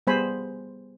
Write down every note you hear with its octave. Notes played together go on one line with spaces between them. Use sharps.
G3 B3 G#4 C5 G#5 B5